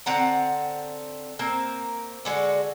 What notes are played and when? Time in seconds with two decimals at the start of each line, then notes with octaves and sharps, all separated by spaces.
0.06 D3 C4 F#5 A#5
1.39 A#3 C4 A#4
2.25 D3 G#3 F#4